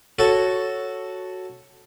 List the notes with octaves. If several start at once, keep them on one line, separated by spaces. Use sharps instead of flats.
F#4 A4 C#5